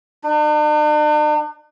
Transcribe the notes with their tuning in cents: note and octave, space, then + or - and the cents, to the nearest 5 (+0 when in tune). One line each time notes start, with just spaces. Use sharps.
D4 +45